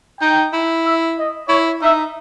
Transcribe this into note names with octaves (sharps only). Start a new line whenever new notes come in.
D#4 G5
E4
E5
D#5
E4 C#5
D#4 E5